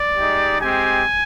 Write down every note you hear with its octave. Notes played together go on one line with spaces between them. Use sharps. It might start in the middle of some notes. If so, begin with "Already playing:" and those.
Already playing: D5
G#3 D#4 G4
G#3 C4 G4 G#5